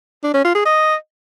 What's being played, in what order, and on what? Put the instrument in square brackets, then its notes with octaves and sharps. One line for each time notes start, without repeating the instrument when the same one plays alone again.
[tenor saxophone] D4
C#4
F4
G#4
D#5